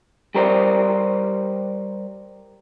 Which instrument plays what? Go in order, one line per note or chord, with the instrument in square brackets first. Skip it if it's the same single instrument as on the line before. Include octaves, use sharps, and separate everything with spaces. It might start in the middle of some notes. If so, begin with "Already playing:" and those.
[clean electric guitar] G3 G4 A#4 C5 D5